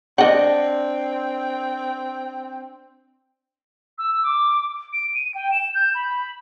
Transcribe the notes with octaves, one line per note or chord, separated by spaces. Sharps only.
C4 D4 D#5 F#5
E6
D6
D7
D#7
G5
E7
G6
B5